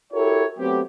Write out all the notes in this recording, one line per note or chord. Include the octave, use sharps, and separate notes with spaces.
E4 F#4 G4 A4 A#4 C#5
F#3 A3 B3 C4 G4